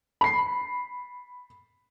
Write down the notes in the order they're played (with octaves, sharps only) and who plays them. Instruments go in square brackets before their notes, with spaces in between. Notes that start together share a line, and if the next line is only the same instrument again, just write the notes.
[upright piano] B5 C7